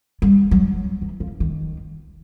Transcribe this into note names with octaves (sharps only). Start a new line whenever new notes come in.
G3
F#3
E3
F3
D#3